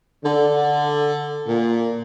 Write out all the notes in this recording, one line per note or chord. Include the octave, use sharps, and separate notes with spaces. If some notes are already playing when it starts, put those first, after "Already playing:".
D3
A#2